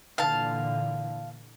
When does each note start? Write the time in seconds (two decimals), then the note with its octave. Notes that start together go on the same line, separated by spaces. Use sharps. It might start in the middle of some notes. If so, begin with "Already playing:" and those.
0.18 A#2 D3 E3 F5 A5